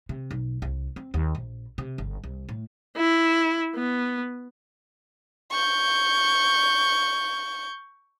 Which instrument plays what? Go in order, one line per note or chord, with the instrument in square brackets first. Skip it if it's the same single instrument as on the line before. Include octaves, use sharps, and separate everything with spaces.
[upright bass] C3
B1
C2
C4
D#2
A#1
C3
G1
C2
A2
[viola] E4
B3
[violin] C#6 G6